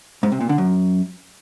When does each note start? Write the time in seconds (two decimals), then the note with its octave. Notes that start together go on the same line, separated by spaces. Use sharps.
0.23 G#2
0.32 C3
0.41 A#2
0.49 D3
0.58 F#2